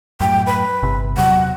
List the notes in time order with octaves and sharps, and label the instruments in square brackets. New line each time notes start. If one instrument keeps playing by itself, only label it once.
[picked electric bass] F#2 A2 [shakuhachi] G5
[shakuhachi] B4
[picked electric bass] G1 C3
[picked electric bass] E2 C3 F#3 [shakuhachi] F#5